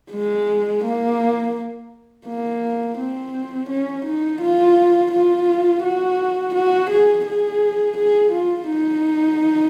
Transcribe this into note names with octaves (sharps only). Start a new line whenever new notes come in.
G#3
A#3
A#3
C4
C#4
D#4
F4
F4
F#4
F#4
G#4
G#4
G#4
F4
D#4